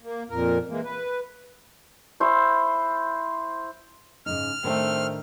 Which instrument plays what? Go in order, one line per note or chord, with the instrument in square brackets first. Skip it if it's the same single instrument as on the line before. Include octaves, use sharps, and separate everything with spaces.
[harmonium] A#3
F2 A#2 A#4
E3 G#3 A#3
B4
[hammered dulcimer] E4 C5 C#6
[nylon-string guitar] G#2 C#3 D#4 [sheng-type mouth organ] F6
[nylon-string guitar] A2 D#3 D4 [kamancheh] A3 C4